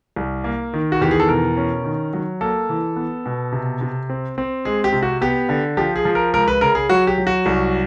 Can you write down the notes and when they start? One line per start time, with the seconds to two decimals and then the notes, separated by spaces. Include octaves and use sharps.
0.16 C2
0.44 A#3
0.74 D#3
0.92 F#4
1.01 E2 G4
1.11 G#4
1.20 A4
1.28 B2 A#4
1.57 C#4
1.84 D#3
2.13 F#3
2.41 A#3 A4
2.69 E3
2.96 B3
3.26 B2
3.52 C3
3.81 C3
4.09 C4
4.38 C4
4.65 G#3 G#4
4.84 G4
4.93 C3
5.03 F#4
5.21 B3 G4
5.49 D3
5.77 F3 G4
5.96 G#4
6.05 F3
6.15 A#4
6.33 C#2 A#4
6.48 B4
6.61 C#3 A#4
6.75 G#4
6.89 F#3 F#4
7.07 G4
7.18 F#3
7.27 F#4
7.46 C2